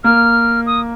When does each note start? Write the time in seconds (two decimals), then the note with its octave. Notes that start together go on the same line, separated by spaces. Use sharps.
0.04 A#3 F6
0.66 D#6